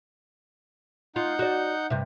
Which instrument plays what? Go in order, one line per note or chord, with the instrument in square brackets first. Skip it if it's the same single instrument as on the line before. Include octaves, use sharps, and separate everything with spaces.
[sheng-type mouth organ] D#4 F#5 G6 [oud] F4
[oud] F#4 D5
G2 C3